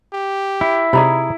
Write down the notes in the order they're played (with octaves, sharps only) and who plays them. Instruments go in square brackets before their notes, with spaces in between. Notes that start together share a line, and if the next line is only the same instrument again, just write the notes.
[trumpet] G4
[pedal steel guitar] E4
[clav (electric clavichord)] C3 D#4 D5 [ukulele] G#4 A#5 B5